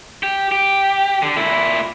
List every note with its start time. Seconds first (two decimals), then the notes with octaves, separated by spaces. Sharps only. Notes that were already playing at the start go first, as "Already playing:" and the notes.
0.23 G4
0.52 G4
1.22 D3
1.37 A#2 E4